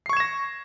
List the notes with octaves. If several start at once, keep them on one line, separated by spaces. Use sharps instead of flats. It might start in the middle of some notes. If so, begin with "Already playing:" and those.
C#6 G#6 A#6 C7 E7